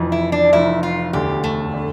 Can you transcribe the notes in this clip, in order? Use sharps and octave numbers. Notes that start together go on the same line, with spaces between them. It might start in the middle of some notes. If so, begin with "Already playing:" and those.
Already playing: F1 F2 E3
E4
D4
F1 F2 E3 E4
F4
E1 D2 D3 G4
A3
D3